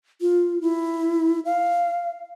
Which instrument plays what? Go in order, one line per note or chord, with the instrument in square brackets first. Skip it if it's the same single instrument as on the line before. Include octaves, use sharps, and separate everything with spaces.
[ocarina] F4
E4
F5